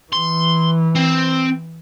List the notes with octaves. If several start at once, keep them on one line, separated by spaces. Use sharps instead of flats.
E3 C6
C4